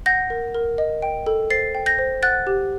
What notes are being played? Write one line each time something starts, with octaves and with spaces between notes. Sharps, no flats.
F#5 G6 A#6
A#4
A#4
D#5
G5
A4
C5 A6 C7
G5
G6 A#6
C5
F#5 F#6 A6
G4